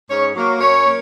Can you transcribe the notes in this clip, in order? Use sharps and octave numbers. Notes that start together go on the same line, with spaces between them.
G#2 C#4 C#5
F#3 A#3
F#2 C#4 C#5
A#3